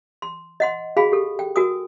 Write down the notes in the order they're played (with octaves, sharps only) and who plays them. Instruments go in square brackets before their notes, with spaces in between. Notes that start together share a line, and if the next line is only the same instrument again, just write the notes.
[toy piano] C6
D#5 F#5 C6
F#4 G#4 F5 G#5 B5
G4 A4
G5
F#4 A#4 G#5 D#6